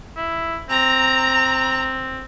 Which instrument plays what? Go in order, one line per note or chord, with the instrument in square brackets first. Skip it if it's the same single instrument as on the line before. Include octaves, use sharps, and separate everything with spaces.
[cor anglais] E4
[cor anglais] C4 [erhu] A#5